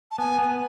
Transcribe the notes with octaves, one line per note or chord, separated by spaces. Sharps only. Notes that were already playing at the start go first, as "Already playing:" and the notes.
A5
B3 G#5
B3